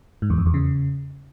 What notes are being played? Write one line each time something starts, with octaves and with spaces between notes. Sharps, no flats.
G#2
E2
F2
E2
C#3